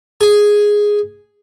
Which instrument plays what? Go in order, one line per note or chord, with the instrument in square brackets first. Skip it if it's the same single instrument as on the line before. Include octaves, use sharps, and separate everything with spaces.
[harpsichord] G#4